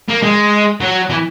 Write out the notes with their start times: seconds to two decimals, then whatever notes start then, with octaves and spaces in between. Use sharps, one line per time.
0.09 A#3
0.23 G#3
0.81 F#3
1.10 E3